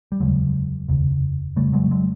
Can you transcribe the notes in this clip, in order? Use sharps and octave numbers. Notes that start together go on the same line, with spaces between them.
G3
F1 D#2 C#3 F#3 G#3
F1 D#2 C#3
F1 D#2 C#3 G3 A3
F#3 G#3
F#3 G#3